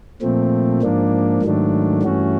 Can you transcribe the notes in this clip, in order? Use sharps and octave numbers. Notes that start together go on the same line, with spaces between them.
A#2 F3 A3 C4
G#2 F3 A#3 D4
G#2 D#3 F#3 A3 D4
G2 E3 A3 C#4 F#4